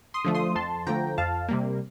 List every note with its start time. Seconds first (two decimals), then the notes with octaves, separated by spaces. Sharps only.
0.14 C6 D#6
0.25 D3 F3 A3
0.35 C6 D#6
0.55 F2 A5 C6
0.87 D3 F3 A3 G5 A#5
1.18 F2 F5 A5
1.49 C3 G3 A#3